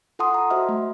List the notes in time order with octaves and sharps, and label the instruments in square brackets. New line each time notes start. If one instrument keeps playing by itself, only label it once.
[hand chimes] F4 A4 F#5 A5 C6 D#6
A#5
F#4 C5 D#5 E5 C6 F6
A3